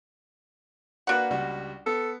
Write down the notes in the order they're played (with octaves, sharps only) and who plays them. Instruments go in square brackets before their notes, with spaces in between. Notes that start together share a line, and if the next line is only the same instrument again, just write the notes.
[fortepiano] A#3 F#4 B4 [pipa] D4 F#5
[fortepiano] C#2 G3 F#4
[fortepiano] B3 [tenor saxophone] A4